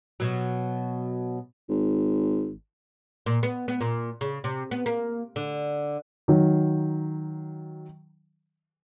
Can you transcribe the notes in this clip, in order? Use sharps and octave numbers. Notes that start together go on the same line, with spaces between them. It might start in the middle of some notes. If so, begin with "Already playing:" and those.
B2 F#3
G#1
A#2
B3
B3
A#2
C#3
C3
B3
A#3
D3
D#3 F#3